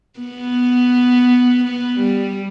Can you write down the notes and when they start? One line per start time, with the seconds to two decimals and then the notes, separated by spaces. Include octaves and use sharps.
0.20 B3
1.64 B3
2.00 G3